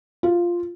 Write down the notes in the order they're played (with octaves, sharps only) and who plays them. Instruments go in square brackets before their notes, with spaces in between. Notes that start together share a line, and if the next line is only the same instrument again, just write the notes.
[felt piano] F4